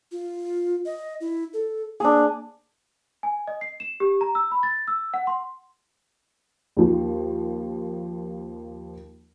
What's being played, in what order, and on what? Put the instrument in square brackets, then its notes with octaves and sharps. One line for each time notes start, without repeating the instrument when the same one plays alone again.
[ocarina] F4
D#5
E4
A4
[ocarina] A#3 [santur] D4 G#4
[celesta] G#5
D#5
C7
E7
G4
A#5
E6
B5
A6
E6
F#5
C6
[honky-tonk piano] D#2 F3